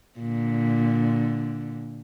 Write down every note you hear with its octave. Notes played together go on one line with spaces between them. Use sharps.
A#2 D3